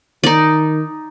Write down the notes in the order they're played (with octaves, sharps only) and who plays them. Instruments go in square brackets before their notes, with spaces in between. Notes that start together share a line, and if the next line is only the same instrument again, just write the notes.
[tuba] D#3 [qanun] D#4 D5